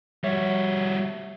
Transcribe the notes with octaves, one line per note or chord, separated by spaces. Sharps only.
G3 F#4 C#5 E5